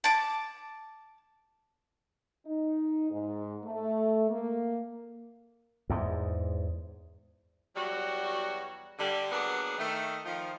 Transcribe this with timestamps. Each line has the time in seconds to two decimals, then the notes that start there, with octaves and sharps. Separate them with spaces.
0.04 A5 D6
2.46 D#4
3.10 G#2
3.63 A3
4.29 A#3
5.90 E2 G#2
7.76 E2 F#3 G3 F#4
8.99 D3 G3
9.32 F#3 A#3 B3 D4 G#4
9.78 D#3 A3
10.25 D#3 F3